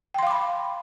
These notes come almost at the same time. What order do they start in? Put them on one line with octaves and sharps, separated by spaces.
G5 C6 F5 D6 B5